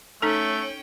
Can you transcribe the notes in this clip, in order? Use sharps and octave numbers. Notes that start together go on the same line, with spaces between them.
A3 C#4 D#4 A4 G5